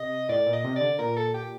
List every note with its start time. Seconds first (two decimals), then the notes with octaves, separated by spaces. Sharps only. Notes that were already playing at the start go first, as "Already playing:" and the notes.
Already playing: C3 D#5
0.29 A2 D5
0.46 A#2
0.53 D#5
0.64 C3
0.76 D3 D5
0.99 A#2 A#4
1.16 A4
1.34 G4